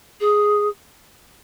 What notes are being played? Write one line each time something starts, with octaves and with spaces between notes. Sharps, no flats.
G#4